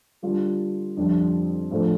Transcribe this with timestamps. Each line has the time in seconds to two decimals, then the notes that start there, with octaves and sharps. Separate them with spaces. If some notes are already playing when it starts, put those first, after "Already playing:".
0.22 D3 G3 D4 F4
0.97 F2 D3 G3 D4
1.71 A2 F3 A3 D4